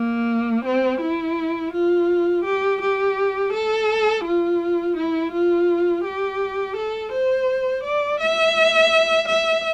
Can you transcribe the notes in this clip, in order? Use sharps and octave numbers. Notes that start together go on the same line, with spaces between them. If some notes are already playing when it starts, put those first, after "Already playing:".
Already playing: A#3
C4
E4
F4
G4
G4
A4
F4
E4
F4
G4
A4
C5
D5
E5
E5